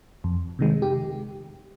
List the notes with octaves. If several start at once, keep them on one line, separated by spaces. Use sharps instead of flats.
F2
C3 D#3 G#3
G4